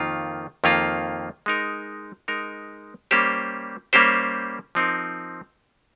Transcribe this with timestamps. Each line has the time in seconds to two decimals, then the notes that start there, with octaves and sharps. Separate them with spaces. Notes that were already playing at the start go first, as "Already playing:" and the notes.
Already playing: F2 D#3 A#3 F4
0.64 F2 D#3 A#3 F4
1.46 G#3 D#4 A#4
2.28 G#3 D#4 A#4
3.11 G3 A#3 C#4 G4 C5
3.93 G3 A#3 C#4 G4 C5
4.75 F3 C4 D#4 A#4